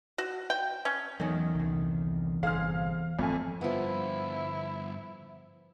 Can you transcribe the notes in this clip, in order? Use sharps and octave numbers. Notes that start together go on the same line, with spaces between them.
F#4
G5
C#4
E2 D#3 F#3 C#4
C2 D3
G1 C3 G#4 C5 F5 F6
G#1 F2 F3 A3 G#5
G2 D3 F3 B3 E4